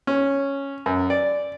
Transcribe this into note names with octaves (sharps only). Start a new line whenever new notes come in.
C#4
F#2
D5